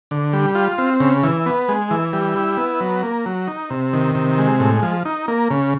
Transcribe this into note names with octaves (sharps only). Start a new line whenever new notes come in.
D3
G3
F4
C4
C#3
E3
B3
G#3
E3
G3
E4
B3
F#3
A#3
F#3
D#4
C3
D#3
C3
G#3
A2
F3
D#4
A#3
C#3